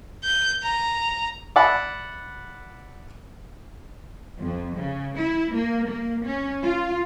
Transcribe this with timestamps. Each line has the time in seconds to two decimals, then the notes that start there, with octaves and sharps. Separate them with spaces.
0.24 G6
0.63 A#5
1.56 D5 E5 F#5 B5
4.38 F2
4.77 C#3
5.18 E4
5.53 A#3
5.87 A#3
6.25 C#4
6.62 F4